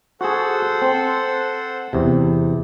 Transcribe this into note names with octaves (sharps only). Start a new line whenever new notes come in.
F#4 G#4 A4 C5 F#5
C4
E2 C3